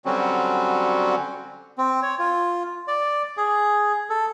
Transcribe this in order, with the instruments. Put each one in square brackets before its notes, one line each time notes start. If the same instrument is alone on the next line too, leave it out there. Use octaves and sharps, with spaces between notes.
[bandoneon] D3 F#3 G3 C4 C#4 F#4
[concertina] C4
C#5
F4
D5
G#4
A4